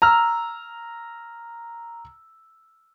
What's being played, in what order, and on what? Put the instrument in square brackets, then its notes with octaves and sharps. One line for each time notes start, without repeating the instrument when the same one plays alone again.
[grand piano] A#5 E6 F6